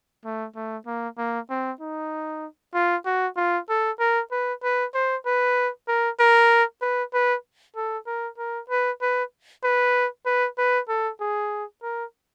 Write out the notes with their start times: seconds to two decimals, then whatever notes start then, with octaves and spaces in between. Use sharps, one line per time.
0.24 A3
0.55 A3
0.86 A#3
1.18 A#3
1.50 C4
1.80 D#4
2.74 F4
3.05 F#4
3.37 F4
3.69 A4
3.99 A#4
4.31 B4
4.63 B4
4.94 C5
5.26 B4
5.88 A#4
6.19 A#4
6.82 B4
7.13 B4
7.76 A4
8.06 A#4
8.38 A#4
8.69 B4
9.01 B4
9.63 B4
10.26 B4
10.58 B4
10.88 A4
11.20 G#4
11.82 A#4